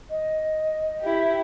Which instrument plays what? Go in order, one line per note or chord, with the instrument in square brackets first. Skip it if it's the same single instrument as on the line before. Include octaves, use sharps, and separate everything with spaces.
[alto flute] D#5
[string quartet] E4 G4